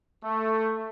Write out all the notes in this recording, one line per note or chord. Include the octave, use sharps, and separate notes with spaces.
A3